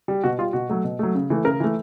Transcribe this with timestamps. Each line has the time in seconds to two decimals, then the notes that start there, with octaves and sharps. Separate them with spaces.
0.08 G3
0.23 B2 F#4
0.38 G3 F4
0.53 B2 F#4
0.69 F#3 A3
0.84 B2
0.99 F#3 A3
1.15 C#3
1.30 E3 A3
1.44 C#3 A#4
1.60 E3 A3